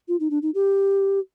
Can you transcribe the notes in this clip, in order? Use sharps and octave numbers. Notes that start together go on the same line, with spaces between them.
F4
D#4
D4
D#4
G4